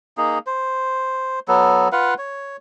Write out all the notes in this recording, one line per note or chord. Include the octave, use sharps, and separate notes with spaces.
A#3 D#4 G#4
C5
F#3 B3 A4
F4 B4 F5 F#5
C#5